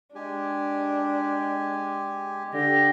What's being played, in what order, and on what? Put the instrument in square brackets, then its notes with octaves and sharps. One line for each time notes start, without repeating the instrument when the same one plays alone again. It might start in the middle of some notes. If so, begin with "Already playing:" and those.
[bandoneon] G#3 G4 G#5 [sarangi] D4
[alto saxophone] D3 [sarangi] G4 [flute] A#6